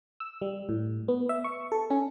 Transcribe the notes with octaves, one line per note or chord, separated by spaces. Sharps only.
E6
G3
A2
B3
E5
C#6
A4
C#4